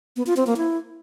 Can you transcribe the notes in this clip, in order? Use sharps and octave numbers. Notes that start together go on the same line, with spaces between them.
B3
F4
C4
A#3
E4